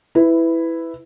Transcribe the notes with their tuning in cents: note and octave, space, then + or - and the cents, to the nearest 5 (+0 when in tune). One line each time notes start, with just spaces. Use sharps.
E4 +0 B4 +15